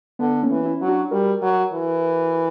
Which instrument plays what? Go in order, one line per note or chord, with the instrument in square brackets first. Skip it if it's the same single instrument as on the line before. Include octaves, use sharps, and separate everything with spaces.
[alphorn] D3 [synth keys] B3
[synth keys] A#3 C#4
[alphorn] E3
[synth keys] C#4 E4
[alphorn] F#3
[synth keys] D4 F#4
[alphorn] G3 [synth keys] F#4 A#4
[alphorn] F#3
E3